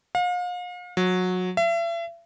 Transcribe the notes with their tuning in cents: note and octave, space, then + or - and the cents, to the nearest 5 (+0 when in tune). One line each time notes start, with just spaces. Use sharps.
F5 +40
F#3 -20
E5 +40